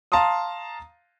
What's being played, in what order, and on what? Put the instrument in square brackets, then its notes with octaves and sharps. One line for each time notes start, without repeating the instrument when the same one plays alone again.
[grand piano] F5 A5 A#5 C6 D#6